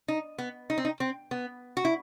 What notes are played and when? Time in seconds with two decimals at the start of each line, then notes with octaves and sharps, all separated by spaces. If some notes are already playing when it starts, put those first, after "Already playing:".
0.08 D#4
0.38 B3
0.70 D#4
0.78 C4
0.85 D#4
1.00 C4
1.31 B3
1.77 F#4
1.85 E4